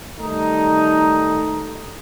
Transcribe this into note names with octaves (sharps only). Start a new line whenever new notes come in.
D#3 G3 A3 D#4